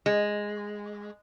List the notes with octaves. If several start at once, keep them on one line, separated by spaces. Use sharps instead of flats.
G#3